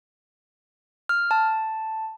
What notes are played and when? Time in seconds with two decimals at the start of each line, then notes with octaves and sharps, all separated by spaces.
1.09 F6
1.31 A5